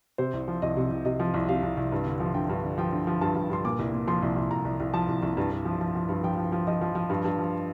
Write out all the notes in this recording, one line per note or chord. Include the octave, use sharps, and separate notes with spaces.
C3 C5
C2
F3
C2 D#5
C3
C2
C3 D#5
F3
C2
C3 F5
C2
C2
G2
D3
F3
D3 G5
G2
D3
F3 G5
D3
F3
G2 A5
G2
G2 C6
A#2 D6
C2
A#2
F3 C6
C2
C2
C2 A#5
C2
C2
F3 A5
C2
C2
G2
G2
F3
F3
F3
G2
F3 G5
F3
F3
F3 D#5
F3
F3
G2
G2
F3